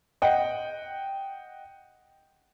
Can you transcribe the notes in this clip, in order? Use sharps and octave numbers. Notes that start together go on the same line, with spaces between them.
D#5 F#5 G5